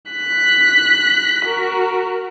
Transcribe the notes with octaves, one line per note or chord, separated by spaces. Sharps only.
F#6 B6
F#4 A#4